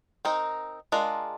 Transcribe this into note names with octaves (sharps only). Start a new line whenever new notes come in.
C4 D#4 A#4
G#3 D4 F4 A#4